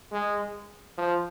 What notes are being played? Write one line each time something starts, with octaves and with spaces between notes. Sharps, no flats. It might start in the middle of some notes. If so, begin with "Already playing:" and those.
G#3
F3